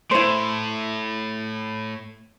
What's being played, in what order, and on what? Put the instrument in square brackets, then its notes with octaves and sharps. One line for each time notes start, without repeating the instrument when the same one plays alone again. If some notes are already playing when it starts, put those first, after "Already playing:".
[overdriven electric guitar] A2 [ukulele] E4 C5